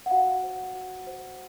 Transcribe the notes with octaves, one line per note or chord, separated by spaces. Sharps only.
F#5
F#4 F5
C5
F#4
C5